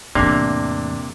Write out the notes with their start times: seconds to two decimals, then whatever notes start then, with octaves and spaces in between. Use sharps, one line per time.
0.15 E2 A2 C3 A#3 D4